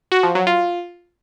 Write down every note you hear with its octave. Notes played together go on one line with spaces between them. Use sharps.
F#4
F3
F#3
F4